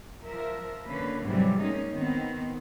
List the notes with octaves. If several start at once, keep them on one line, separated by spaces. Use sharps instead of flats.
F3 A#4 E5
D3 A#3 C#4 B4
G#2 C3 E3 F#3 G3
G#3 A#3 C#4 D#4
D#3 B3 C4